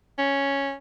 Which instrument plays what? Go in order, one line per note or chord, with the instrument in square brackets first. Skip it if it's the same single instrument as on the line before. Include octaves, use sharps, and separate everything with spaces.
[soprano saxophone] C#4